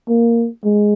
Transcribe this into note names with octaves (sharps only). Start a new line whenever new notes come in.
A#3
G#3